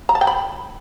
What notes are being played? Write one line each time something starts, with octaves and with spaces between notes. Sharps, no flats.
A#5
A5
G5
B5